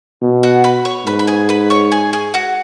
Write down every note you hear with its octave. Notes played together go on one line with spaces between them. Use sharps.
B2
F#4 F#5
B4 B5
C#5 C#6
G#2 B4 B5
B5
G#4 G#5
B4 B5
C#5 C#6
G#4 G#5
G#4 G#5
F#4 F#5